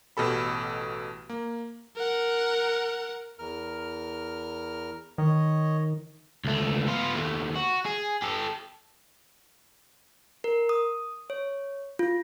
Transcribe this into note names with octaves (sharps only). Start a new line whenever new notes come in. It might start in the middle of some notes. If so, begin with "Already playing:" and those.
A1 B2 G4 A4 B5
A#3
A#4 F#5
E2 A#4 F6
D#3 C#5 D#5
C#2 A3
B3 F4
D#2 A3
F#4
G#4
G4 A4
A#4
D#6
C#5
F4